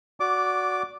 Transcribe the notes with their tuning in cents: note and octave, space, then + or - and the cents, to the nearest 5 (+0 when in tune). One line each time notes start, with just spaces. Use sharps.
F#4 -5 D5 -20 D6 +0